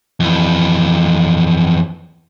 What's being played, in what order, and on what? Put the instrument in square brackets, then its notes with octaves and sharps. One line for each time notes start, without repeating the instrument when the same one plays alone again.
[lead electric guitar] F2 E3